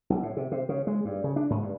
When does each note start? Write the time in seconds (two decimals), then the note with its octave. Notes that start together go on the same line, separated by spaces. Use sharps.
0.10 B1
0.23 A2
0.37 C3
0.52 C3
0.69 C#3
0.87 G#3
1.05 G2
1.24 C#3
1.36 D4
1.50 G#2
1.63 G2